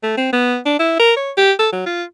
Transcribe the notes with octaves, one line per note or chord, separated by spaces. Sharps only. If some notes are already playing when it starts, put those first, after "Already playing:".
A3
C4
B3
D4
E4
A#4
C#5
G4
A4
F#3
F4